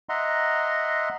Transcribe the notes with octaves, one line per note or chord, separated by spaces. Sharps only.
D#5 E5 F#5 A#5 C6